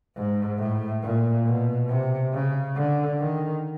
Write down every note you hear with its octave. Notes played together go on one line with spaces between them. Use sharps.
G#2
A2
A#2
B2
C3
C#3
D3
D#3